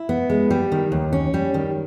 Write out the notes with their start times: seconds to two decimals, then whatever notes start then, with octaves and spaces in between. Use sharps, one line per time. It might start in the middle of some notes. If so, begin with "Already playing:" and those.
Already playing: E4
0.09 B3
0.30 G#3
0.50 G3
0.72 D#3
0.92 D#2
1.13 C#4
1.34 G3
1.54 D#3